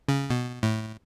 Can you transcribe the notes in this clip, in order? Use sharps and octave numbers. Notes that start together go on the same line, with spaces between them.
C#3
B2
A2